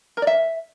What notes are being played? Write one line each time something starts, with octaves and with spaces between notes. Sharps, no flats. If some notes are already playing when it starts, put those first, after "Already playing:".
A#4
D5
E5